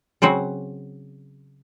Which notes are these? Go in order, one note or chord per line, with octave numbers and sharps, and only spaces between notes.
C#3 F#3 C4 F#4